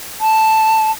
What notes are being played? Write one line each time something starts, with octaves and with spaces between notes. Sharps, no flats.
A5